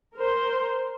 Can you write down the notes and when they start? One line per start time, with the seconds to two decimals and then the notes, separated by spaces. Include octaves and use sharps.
0.15 A#4 C5